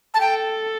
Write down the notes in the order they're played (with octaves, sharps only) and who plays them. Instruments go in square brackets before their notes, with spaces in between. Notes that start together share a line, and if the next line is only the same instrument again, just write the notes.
[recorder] A5
[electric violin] A4 [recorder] G5